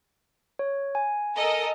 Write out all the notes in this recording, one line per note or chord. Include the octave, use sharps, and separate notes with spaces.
C#5
G#5
A4 A#4 D#5